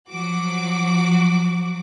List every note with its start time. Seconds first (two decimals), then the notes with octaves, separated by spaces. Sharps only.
0.10 F3 F#3 F#4 D6